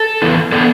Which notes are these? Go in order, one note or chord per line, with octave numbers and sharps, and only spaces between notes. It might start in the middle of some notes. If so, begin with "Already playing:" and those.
Already playing: A4
E3 B3 E4
E3 B3 D4 A4 D5